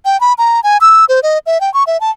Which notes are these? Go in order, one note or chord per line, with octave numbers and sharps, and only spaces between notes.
G5
B5
A#5
G#5
E6
C5
D#5
E5
G5
C#6
E5
A5